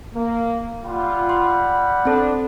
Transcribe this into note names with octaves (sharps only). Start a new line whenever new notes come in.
A#3
G3 F4 F#5 B5
C6
C4 D4 A4